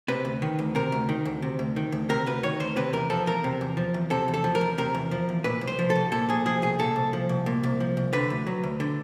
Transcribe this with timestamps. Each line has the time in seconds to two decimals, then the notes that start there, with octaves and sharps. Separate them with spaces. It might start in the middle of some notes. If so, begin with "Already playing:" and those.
0.08 C3 B4
0.25 D2
0.42 D#3
0.59 D2
0.75 C3 A#4
0.92 D2
1.09 D#3
1.25 D2
1.42 C3
1.59 D2
1.76 D#3
1.92 D2
2.09 C3 A#4
2.26 D2 B4
2.43 D#3 C#5
2.60 D2 C5
2.76 C3 B4
2.93 E2 A#4
3.10 F3 A4
3.26 E2 A#4
3.44 C3
3.61 E2
3.77 F3
3.94 E2
4.10 C3 A4
4.28 E2
4.34 A4
4.44 F3
4.55 A#4
4.61 E2
4.78 C3 A#4
4.94 E2
5.11 F3
5.29 E2
5.44 A#2 B4
5.61 C2
5.67 C5
5.79 F3
5.90 A4
5.95 C2
6.12 A#2 A4
6.29 C2 G#4
6.46 F3 G#4
6.62 C2 G#4
6.79 A#2 A4
6.96 C2
7.13 F3
7.29 C2
7.46 A#2
7.63 C2
7.80 F3
7.97 C2
8.13 D3 B4
8.30 D2
8.47 F#3
8.63 D2
8.80 D3